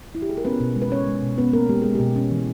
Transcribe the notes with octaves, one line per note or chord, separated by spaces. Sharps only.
E4
G4
G#4
A#4
B3 C#4 B4
B2
G#3
B4
C#4 C#5
G#3
B2
B3 C#4 B4
A#3 C#4 A#4
G#3 G4
G#3 G#4
B2 G4
C#4
E3